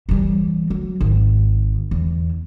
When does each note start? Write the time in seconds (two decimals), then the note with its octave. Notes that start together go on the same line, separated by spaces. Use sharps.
0.09 E3 G3
0.70 F#3
1.01 G#1
1.91 E2